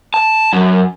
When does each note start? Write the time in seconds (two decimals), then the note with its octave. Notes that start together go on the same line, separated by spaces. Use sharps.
0.14 A5
0.53 F#2